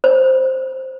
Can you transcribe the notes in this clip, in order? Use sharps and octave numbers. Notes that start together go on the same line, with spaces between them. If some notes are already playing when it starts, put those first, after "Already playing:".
C5